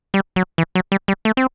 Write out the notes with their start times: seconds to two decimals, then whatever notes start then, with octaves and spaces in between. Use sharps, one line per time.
0.14 G3
0.36 F#3
0.58 E3
0.75 F#3
0.92 G3
1.08 G3
1.25 A3
1.37 C4